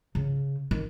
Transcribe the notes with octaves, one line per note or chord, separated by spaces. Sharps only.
C#3
D#3